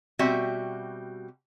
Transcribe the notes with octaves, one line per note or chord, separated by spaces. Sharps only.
B2 G3 C4 F#4 E5